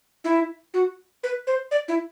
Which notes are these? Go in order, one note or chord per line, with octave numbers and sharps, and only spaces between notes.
E4
F#4
B4
C5
D5
E4